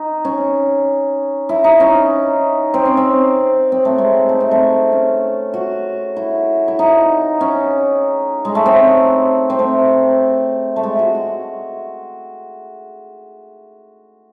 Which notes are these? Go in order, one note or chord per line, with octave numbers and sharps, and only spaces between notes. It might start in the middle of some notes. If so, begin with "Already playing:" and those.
Already playing: D#4
C#4
E4
D#4
C#4
C4
C#4
C4
C4
A3
G#3
A3
C4
A3
C#4
F#4
E4
E4
D#4
C#4
G#3
A3
C4
C4
A3
A3
G#3
F#4
F#4